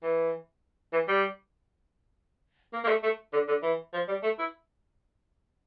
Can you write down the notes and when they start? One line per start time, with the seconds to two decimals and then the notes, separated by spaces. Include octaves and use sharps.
0.03 E3
0.93 E3
1.08 G3
2.73 A#3
2.84 A#3
2.88 A3
3.03 A3
3.33 D3
3.48 D3
3.63 E3
3.93 F3
4.08 G3
4.23 A3
4.39 E4